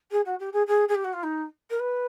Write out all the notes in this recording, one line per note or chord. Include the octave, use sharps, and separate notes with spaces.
G#4
F#4
G4
G#4
G#4
G#4
G4
F#4
F4
D#4
A#4
B4